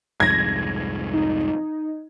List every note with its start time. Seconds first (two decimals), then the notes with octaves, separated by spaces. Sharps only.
0.20 C2 F2 G#2 G#6 A#6
1.13 D#4